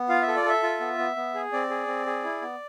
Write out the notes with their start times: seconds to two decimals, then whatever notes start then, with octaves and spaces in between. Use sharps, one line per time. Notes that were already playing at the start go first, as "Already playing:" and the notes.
Already playing: B3
0.09 F4 F5
0.22 E5
0.28 A4
0.36 D5
0.45 A4 E5
0.63 F4
0.81 B3
0.98 B3
1.16 B3
1.35 G#4
1.53 C4 D5
1.70 G#4
1.87 C4
2.06 G#4
2.24 E4
2.42 B3